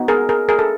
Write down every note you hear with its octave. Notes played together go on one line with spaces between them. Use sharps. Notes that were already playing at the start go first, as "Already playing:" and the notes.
Already playing: B3 D#4 F#4
G#4 A#4
G#4 A#4
G#4 A#4
A4